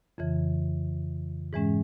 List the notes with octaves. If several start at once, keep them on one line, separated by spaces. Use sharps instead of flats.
F2 C#3 E3
G#2 E3 G#3 C#4